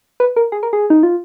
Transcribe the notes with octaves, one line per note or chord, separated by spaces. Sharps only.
B4
A#4
G#4
A#4
G#4
D#4
F4